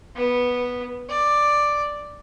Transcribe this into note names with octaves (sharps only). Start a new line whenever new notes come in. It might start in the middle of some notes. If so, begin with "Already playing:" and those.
B3
D5